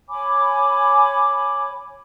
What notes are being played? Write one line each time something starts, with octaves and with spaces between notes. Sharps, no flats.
C#5 G#5 B5 D6